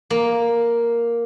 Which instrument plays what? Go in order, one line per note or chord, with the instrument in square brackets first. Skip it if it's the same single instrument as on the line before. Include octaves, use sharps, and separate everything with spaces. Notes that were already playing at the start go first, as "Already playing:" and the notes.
[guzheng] A#3